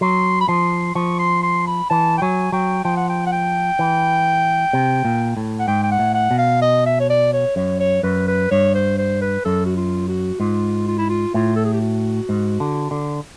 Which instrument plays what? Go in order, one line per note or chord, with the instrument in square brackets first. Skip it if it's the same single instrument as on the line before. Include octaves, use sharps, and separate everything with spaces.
[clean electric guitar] F#3 [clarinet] C6
[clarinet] B5
[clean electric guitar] F3 [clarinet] C6
[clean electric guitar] F3 [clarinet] C#6
[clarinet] C6
C6
B5
[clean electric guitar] E3 [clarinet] A5
[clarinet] G5
[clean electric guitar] F#3 [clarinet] G#5
[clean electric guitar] F#3 [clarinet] G5
[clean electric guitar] F3 [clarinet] G5
[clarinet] F#5
G5
F#5
G5
[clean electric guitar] E3
C3
A#2
A2
[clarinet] F#5
[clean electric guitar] G#2 [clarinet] G5
[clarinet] G5
F#5
[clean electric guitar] A2
[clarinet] F#5
[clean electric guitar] B2
[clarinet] F5
D#5
E5
C#5
D5
C#5
[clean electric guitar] F#2 [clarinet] C#5
[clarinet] C#5
[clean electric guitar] F#2 [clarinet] B4
[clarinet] B4
[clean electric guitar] G2 [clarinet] C#5
[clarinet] C5
C5
B4
[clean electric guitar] F#2 [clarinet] A4
[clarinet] F#4
F4
F#4
[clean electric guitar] G#2 [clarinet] F4
[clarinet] F4
E4
F4
[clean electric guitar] A2 [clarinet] F4
[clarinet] A4
G#4
G4
F#4
[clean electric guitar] G#2
D3
D3